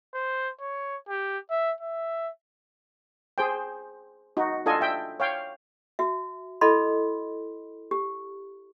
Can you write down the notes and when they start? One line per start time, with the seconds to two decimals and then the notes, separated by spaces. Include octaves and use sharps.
0.14 C5
0.61 C#5
1.09 G4
1.50 E5
1.81 E5
3.38 G#4 C5 G5
4.37 D#4 F#4
4.66 D4 F4 A4 D#5 G#5
4.81 E5 G5
5.20 C#5 F5 G5
5.99 F#4 E5
6.61 E4 A4 D#5 B5 C6
7.91 G4